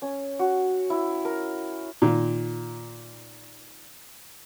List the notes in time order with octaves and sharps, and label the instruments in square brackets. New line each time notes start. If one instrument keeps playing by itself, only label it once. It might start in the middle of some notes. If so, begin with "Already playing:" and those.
[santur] C#4
F#4
E4
A#4
[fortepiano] A#2 D#3